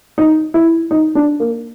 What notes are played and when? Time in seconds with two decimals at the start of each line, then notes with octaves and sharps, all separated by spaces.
0.18 D#4
0.54 E4
0.91 D#4
1.15 D4
1.40 A#3